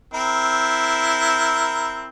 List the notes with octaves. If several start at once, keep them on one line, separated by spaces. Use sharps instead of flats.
C4 E4 A#4